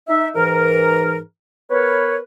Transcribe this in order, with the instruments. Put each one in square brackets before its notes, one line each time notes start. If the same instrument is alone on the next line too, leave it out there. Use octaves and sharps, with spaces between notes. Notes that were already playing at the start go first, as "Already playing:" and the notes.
[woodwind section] D#4 E5
G#2 E3 A#4
B3 A#4 B4 C#5